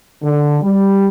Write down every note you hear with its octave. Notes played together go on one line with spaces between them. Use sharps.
D3
G3